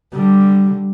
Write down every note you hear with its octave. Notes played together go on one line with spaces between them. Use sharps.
D3 G3